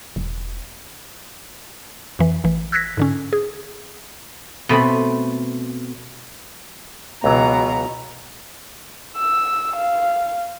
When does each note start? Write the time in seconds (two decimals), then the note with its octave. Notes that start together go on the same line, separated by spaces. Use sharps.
0.16 E1
2.19 F2 E3
2.44 A1 E3
2.72 E6 F#6 G#6 A#6 B6
2.97 G#2 D3 C#4
3.33 G#4
4.69 B2 A3 C4 B5
7.24 C#2 B2 E3 F#3 A#5
9.18 E6
9.76 F5